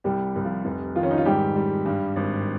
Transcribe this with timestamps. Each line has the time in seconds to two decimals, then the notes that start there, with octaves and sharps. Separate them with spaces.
0.04 C2 G3 G4
0.36 C2
0.45 F3 F4
0.65 F1
0.95 D#3 F3 F4
1.03 C#4
1.11 D#4
1.18 F4
1.25 G#2 G3 G4
1.56 G3
1.86 G2
2.16 G#1